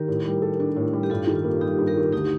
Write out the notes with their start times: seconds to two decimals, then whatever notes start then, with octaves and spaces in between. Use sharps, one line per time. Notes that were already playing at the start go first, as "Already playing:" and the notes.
Already playing: D#3 G4 A#4
0.08 A2
0.25 G3
0.42 A4
0.60 D4
0.76 A2
0.93 G3
1.03 G4
1.10 G2 F4 A4
1.27 D#3
1.36 F4
1.44 A#3
1.61 G3 D#4 G4
1.78 G2
1.87 G4 A#4
1.96 D#3
2.12 D2 D#4 G4